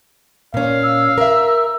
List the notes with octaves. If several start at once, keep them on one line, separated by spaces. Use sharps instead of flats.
A#2 C#4 F5
E6
A#4 E5